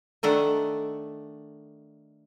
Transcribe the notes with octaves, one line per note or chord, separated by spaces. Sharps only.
D#3 A3 D4 F#5